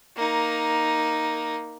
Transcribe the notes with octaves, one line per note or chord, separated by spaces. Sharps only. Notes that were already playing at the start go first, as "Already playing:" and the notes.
A#3 D#4